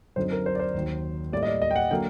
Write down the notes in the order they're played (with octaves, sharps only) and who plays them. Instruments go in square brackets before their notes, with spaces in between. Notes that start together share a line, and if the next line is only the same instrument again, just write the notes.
[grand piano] F#2 D3 F#3 C4 D#4 C5
A#4
C5
D5
C5
D#2 D#3 F#3
A2 G3 A#3 D5
D#5
D5
D#5
G5
F#5
D3 F#3 A#3 G5